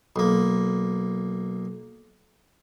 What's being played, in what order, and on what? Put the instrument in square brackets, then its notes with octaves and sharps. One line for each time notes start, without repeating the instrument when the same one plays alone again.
[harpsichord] B1 A#3